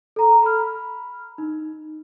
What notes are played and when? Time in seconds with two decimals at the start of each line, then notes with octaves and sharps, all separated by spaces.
0.16 A4 A#5
0.43 B5 F6
1.38 D#4